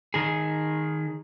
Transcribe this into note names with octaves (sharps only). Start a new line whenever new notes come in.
D#3 G#4